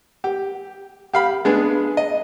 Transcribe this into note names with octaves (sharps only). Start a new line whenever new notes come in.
G4
G4 F5 B5
G#3 B3 D4 G#4
D#5